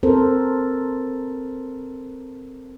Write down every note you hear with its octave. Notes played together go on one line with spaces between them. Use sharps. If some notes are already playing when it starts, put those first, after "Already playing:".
C4 A4 A#4 C5